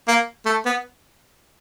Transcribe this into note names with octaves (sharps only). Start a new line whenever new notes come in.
A#3
A3
B3